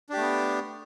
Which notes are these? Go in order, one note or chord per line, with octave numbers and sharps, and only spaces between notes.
A3 B3 D4 G4